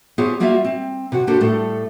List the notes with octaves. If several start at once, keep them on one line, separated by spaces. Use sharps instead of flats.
B3 F4 G4 G#4 C5 C#5
G3 A#3 F4 F#4 E5 F5
C4
C3 F#4 F#5
A#3 D4 F#4 G4 A4 C5
A2 G3 A3 A4